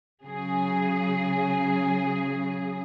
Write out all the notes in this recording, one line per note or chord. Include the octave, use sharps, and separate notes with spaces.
C#3 F#3 G#4